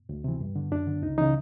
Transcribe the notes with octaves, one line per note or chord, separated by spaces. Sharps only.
D2
C3 E3
G2
D3
F#2 D4
D3
C#2 D#4
C#3 E3 D#4